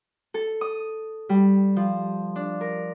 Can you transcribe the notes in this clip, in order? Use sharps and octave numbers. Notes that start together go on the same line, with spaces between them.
A4
D#6
G3
F3
D4
A#4